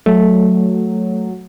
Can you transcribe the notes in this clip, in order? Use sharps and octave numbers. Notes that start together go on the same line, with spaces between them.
F#3 A3